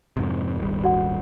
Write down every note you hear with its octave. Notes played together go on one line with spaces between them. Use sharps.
F2 G#2 C3
D#1 G#1 G3
F#4 D5 F#5